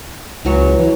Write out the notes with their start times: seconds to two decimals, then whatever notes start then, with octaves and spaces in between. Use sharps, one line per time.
0.45 C#2 E3 F#3 C#5
0.79 E3